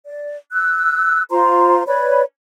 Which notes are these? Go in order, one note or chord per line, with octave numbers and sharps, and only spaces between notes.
D5
E6 F#6
F4 C5 A#5 C6
B4 C#5 D5 B5